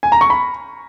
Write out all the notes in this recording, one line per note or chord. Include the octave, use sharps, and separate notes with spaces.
G#5
A#5
C#6
B5